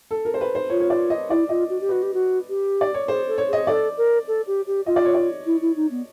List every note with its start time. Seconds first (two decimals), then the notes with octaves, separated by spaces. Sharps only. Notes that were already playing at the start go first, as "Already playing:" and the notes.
0.11 A4
0.25 A#4
0.34 C5
0.41 B4
0.55 C5
0.70 F4 C#5
0.80 C#5
0.90 D5
1.10 D#5
1.30 E4 D5
1.49 F4 D#5
1.70 F#4
1.81 G4
1.89 F#4 B4
2.03 G4
2.14 F#4
2.49 G4
2.81 D5
2.94 C#5
3.08 G#4 C5
3.28 A4
3.38 C#5
3.48 G#4 D#5
3.67 A4 D5
3.97 A#4
4.28 A4
4.47 G4
4.67 G4
4.86 F4 D#5
4.96 D5
5.05 C#5
5.14 D5
5.46 E4
5.61 E4
5.76 D#4
5.91 B3